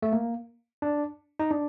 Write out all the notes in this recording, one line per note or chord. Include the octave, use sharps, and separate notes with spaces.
A3
A#3
D4
D#4
D4